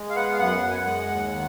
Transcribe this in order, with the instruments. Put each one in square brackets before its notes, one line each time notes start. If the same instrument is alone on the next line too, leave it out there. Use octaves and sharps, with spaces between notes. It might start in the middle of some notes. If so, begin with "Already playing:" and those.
Already playing: [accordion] G#3
F5
B3 F#5
F5
F#2 F#5
F#2
G#5
F#5
G#3
D#2
D#3